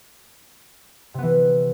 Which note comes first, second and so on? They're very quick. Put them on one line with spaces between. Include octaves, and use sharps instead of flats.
C3 B3 E3